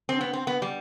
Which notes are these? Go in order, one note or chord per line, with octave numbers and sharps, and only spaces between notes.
C4
B3
C4
B3
G3